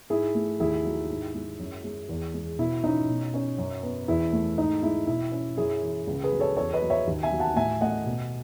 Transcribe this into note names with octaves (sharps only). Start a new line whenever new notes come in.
G#2 E4 G#4
A3
D#2 E4 G#4
F#3
G#2
G#3
F#2
G#3
E2
G#3
B2 E4
C#4 D#4
B2
C#4
F#2
B3
E2 E4
A3
G#2 D#4
G#3 E4
B2 E4
C#4
F#2 E4 G#4
E3
C#2
G#4 B4
F#3
A4 C#5
E2 A4 C#5
B4 D#5
F#3
C#5 E5
D#2
E5 G#5
F#3
F#5 A5
A2 E5 G#5
A3 D#5 F#5
B2